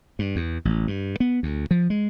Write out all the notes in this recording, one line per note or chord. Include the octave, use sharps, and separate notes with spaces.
G2
E2
A1
G2
B3
D2
F3
G#3